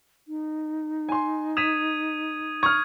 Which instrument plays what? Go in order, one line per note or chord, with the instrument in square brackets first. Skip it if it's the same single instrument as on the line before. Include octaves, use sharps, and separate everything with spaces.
[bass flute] D#4
[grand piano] G#5 C6
[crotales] D#6 G#6 D#7 [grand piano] B6 E7
[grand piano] C#6 F6 [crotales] D#6 G#6